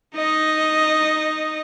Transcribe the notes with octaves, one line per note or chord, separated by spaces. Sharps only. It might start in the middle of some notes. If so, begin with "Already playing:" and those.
D#4 D#5